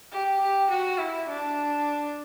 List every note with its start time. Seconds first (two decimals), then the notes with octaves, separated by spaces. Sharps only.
0.12 G4
0.41 G4
0.70 F#4
0.98 E4
1.28 D4